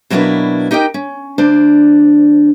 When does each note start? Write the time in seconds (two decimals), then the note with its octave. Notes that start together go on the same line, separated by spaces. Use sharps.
0.10 B2 F#3 A#3 D4 E4 B4
0.71 D#4 G4 A#4 D#5 G5
0.94 C#4
1.38 D2 D4 C5 D5